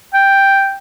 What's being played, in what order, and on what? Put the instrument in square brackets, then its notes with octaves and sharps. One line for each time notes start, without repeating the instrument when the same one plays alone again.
[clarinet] G5